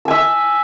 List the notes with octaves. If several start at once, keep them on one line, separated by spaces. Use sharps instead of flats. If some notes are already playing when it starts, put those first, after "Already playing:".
E5 G#5 E6